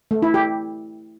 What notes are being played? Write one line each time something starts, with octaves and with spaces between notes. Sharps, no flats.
A3
E4
G4